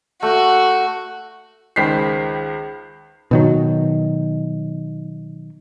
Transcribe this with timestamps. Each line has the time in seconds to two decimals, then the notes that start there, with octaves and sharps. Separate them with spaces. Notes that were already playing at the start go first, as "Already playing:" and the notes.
0.23 A3 F#4
1.76 C#2 D#3 C5 B6 C7
3.31 B2 D#3 F#3